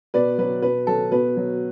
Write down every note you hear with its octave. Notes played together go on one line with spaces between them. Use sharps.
B2 B4 D5
F#3 B4
B2 B4
F#3 A4
B2 B4
F#3